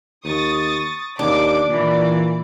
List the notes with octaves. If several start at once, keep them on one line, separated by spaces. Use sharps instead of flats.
D#2 C#6 D#6 A6
D#2 D4 D6
A#2 E3 D5